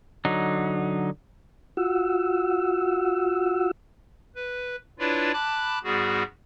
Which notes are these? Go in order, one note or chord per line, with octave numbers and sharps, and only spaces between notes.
D3 F#3 D#4
F4 F#4 F#5 E6
B4
D4 E4 F4 B4 C#5 D5
A5 B5 D6 F#6
G#2 G3 B3 F#4 G#4